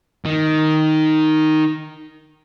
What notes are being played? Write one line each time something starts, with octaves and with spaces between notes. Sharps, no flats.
D#3 D#4